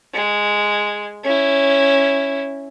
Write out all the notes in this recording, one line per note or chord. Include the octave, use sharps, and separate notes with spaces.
G#3
C#4 E4